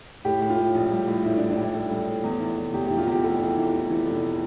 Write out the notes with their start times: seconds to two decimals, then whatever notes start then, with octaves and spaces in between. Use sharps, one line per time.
0.25 A2 G4
0.41 A2
0.50 F4
0.57 A2
0.75 A#1
0.91 G3
1.07 A2
1.24 A2 E4
1.36 D4
1.41 G3
1.49 D4
1.57 G3 E4
1.74 A2 A4
1.91 G3
2.07 A2
2.24 E2
2.40 E3
2.57 F1
2.74 E2 G4
2.86 G4
2.90 E3
2.98 F4
3.07 E2 G4
3.24 F1 A4
3.40 E3
3.57 E3
3.73 E3
3.90 E3
4.06 F1